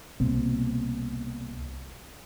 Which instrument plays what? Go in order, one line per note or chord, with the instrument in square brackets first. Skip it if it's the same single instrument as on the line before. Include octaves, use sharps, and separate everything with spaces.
[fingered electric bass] C2 B2 A#3 C4